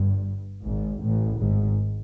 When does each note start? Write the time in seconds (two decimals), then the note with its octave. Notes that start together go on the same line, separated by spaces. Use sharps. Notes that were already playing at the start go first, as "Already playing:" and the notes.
Already playing: G1 G2
0.64 G#1 G#2
1.01 A1 A2
1.39 G#1 G#2